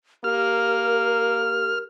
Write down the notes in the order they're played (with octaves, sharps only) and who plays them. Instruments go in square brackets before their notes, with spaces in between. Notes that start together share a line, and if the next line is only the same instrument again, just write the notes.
[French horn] A#3 [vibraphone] G4 [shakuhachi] A#4 [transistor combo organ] F6